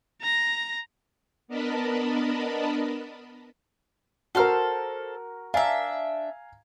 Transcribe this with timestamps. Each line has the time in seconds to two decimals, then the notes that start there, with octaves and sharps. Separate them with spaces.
0.21 A#5 A#6
1.48 B3 D4 A#4 D#5 A5 B5
4.35 F#4 A4 A#4 C5 F6
5.54 D4 E5 F5 G#5 A#5